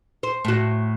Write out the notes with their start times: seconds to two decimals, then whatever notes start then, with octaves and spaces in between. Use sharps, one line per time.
0.23 C5
0.45 A2 F#4